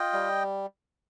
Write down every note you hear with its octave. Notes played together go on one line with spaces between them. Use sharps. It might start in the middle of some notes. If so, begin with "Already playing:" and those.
Already playing: F4 D#5 G5
G3